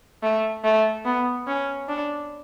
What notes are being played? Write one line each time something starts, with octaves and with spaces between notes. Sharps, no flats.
A3
A3
B3
C#4
D4